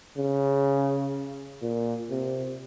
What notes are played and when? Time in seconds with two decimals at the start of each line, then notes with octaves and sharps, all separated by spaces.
0.17 C#3
1.62 A#2
2.10 C3